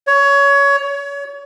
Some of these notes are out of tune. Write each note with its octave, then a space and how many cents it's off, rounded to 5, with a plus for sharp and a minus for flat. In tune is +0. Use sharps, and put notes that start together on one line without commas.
C#5 +20
C#5 +30